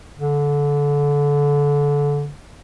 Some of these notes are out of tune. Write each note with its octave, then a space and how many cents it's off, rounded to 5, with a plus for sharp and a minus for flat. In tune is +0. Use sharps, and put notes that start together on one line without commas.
D3 -25